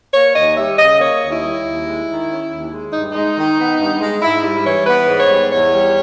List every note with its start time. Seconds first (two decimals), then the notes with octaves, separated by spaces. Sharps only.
0.14 A#3 C#5
0.36 D#2 D#5
0.57 G3 E5
0.79 C#3 D#5
1.00 A#3 C#5
1.21 D#2
1.32 E4
1.43 G3
1.64 D#2
1.86 G#3
2.08 D#3
2.29 C#4
2.50 D#2
2.71 G#3
2.93 G2 D#4
3.12 G#3 D#4
3.36 D#3
3.58 B3
3.79 G2
4.00 G#3
4.22 G#2 E4
4.43 G3 E4
4.65 E3 C#5
4.86 B3 B4
5.08 G#2
5.19 C#5
5.30 G3
5.51 E2 C#5
5.73 G3